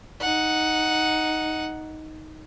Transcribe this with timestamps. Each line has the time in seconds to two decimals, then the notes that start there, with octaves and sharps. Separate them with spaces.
0.21 D#4 F#5